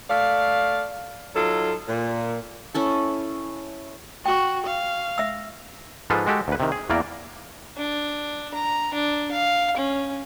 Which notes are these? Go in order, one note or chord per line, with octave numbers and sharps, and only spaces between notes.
A3 D5 F5
F#3 D#4 F4 A4
A#2
C#4 E4 A4
F#4 G5 C#6
F5
E5 E6
G#2 F3 G#3 F4 A4 B4
G#3 F#4 G4 A4
D2 B4
C3 D#3
G#4
E2 E3 A#3 A#4 D5
D4
A#5
D4
F5
C#4